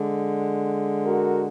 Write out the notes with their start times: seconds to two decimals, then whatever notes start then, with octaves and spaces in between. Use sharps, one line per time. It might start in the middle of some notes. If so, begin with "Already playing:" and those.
Already playing: D3 G#3
1.04 F#4 A#4